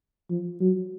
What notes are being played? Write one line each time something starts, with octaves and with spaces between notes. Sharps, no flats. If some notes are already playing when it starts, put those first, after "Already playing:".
F3
F#3